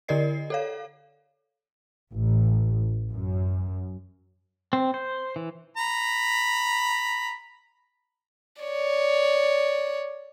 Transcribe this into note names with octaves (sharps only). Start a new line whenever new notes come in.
D3 E4 A#4 D5 D#5 C7
A4 C#5 F5
A1
F#2
C4
C5
E3
A#5 B5
C#5 D5